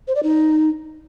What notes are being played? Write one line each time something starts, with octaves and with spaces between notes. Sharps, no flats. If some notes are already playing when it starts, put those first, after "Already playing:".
C5
D5
D#4